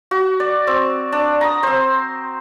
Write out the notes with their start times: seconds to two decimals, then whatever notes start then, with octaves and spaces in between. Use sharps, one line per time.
0.11 F#4
0.40 D5
0.67 C4
1.12 D4
1.41 A#5 D#6
1.63 C4 C5